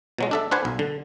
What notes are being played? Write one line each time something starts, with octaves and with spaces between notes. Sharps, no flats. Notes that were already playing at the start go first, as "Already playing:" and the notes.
B2 F#3 G#3
D4 A4 E5
D4 B4 C5 F#5 G#5
B1
D3